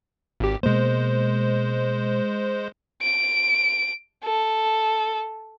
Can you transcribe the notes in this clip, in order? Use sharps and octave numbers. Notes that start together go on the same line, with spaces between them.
G#1 G4
B2 G#3 A#3 C5
D7
A4